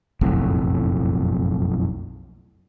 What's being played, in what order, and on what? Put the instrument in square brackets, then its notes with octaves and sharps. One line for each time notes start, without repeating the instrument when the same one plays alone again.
[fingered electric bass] F#1 B1 F2 A2